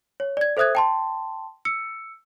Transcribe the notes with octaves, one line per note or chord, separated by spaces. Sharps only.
C#5
D5 G#6
A4 C5 E5 D#6 F#6 G#6
G5 A5 C6
E6 C#7